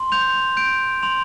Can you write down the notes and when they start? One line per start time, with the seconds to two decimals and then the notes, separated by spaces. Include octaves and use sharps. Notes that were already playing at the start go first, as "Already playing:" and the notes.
Already playing: C6
0.12 G6 F7
0.57 G6 D7
1.03 C6 F7